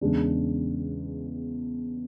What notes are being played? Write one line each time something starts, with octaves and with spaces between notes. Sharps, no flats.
E2 C#3 G#3 D4